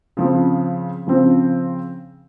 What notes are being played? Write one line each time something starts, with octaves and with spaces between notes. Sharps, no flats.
C#3 F3 C4
C#3 F3 C4